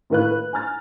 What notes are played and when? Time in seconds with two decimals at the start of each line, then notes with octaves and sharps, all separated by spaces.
0.10 A2 D#3 A3 B4 F5 F#6
0.31 B4
0.53 G#5 A#5 F6 A6